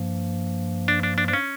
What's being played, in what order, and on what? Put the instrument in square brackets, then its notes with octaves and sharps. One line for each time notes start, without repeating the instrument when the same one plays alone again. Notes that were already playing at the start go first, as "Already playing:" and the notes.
Already playing: [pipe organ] G2 F3 A#3
[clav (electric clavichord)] D4
D4
D4
D4
C#4